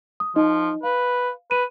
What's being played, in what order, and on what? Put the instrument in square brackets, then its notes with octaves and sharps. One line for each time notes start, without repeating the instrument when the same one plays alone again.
[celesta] D#6
[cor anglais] F3 [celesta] D#4 D#5
[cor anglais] B4 [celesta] F5
[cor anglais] B4 [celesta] D#7